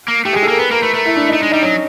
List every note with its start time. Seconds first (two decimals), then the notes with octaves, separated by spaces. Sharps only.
0.08 A#3
0.25 A3 G4
0.33 G#3 G#4
0.43 A4
0.48 A#3
0.51 A#4
0.59 B3 B4
0.71 A#3 A#4
0.82 A3 B4
0.94 A3 A#4
1.06 E4
1.17 D4
1.29 A3 D#4
1.40 G#3 D4
1.52 G3 D#4
1.62 F#3 C#4